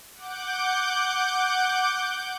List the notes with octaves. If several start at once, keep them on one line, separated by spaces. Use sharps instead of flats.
F#5 D6 G6